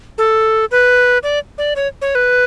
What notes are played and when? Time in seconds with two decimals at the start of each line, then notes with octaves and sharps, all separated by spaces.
0.18 A4
0.71 B4
1.23 D5
1.58 D5
1.76 C#5
2.02 C#5
2.15 B4